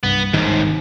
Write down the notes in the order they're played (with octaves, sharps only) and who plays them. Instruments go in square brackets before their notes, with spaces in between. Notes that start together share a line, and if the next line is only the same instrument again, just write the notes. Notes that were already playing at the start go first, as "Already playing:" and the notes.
[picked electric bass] C2 G2 [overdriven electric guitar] B3
[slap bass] G#1 D#3 [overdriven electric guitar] D#2 G#2